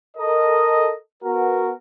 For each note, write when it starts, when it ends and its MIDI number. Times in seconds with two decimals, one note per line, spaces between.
0.17 0.94 69
0.17 0.94 70
0.17 0.94 75
1.24 1.71 59
1.24 1.71 66
1.24 1.71 70